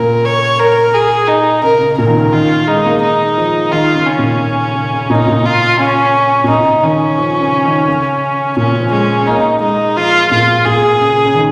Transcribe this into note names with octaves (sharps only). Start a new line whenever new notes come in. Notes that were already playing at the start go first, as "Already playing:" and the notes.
Already playing: A#2 C#3 A#4
C#5
A#4
G#4
D#4
C#3 A#4
C#3
A#2 A#4
D#3
C#3
D#3 F4
G#3 D#4
A#3
D#4
F3
D#3 F4
C#3
C#4
A#2
C#3
C#3
C#3
A#2 D#4
C#3
A#2
F4
C#4
A#2
C#3 D#4
D#3 C#4
F3
C#3
D#3
C#3
A#2 C#4
F3
G#3 C#4
A#3 D#4
G#3 D#4
F3 F4
A#2 F4
A#2 G#4
C#3
C#3
D#3